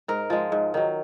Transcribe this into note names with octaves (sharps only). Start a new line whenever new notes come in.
G#2 A#4
F3 G#3
G#2
D#3 F#3